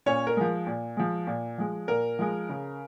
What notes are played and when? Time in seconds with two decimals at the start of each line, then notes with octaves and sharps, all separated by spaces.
0.06 A#2 C#4 C#5
0.27 A#4
0.37 F3 G#3
0.67 A#2
0.97 F3 G#3
1.27 A#2
1.58 F3 G#3
1.88 A#2 A#4
2.19 F3 G#3
2.49 C#3